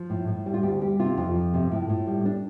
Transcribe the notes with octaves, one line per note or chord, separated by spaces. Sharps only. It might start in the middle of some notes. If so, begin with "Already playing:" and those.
Already playing: F3
A2
A2
G3
F4
D2 G4
G3 G4
C3 F4
F2 F4
F3
C3
A2
A2
G3
D4